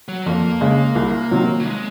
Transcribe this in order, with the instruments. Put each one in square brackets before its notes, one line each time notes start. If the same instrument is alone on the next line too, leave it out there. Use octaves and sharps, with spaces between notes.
[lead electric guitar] F#3
[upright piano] F2 [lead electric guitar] A#3
[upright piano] C#3 G#3
C2
C3 D#3 F#3
[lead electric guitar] F#3
G#3